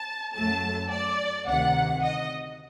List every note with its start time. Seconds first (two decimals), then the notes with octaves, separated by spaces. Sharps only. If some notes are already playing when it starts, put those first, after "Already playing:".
Already playing: A5
0.34 F#2 F#3 A3 A5
0.90 D5
1.47 D2 C3 D#3 F#5
2.03 D#5